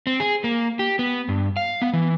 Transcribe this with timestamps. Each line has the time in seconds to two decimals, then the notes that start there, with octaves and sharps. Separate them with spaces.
0.07 C4
0.20 G#4
0.44 A#3
0.79 G4
0.99 B3
1.29 G2
1.57 F5
1.82 B3
1.93 E3